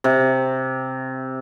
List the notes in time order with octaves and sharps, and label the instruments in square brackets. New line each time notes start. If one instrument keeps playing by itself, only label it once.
[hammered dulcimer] C3